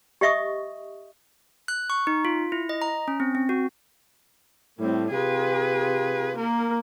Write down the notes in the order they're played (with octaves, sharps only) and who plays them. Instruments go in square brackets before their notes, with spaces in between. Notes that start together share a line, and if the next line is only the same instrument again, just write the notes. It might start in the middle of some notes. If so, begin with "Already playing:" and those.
[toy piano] G4 D#5 E5 C#6 D#6
[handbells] F#6
C#6
D#4
F4
E4
D#5
A#5
C#4
C4
C4
F#4
[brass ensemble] A2 [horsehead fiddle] G3 C4
[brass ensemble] C3 F4 G4 [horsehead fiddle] G#4 B4
[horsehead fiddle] A#3 A#4